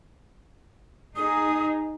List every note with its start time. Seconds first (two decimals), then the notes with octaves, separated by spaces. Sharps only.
1.16 D#4 G#4 D#6